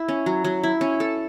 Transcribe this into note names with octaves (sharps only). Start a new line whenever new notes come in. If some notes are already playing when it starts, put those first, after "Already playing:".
Already playing: E4
C#4
F#3
F#3
E4
C#4
A4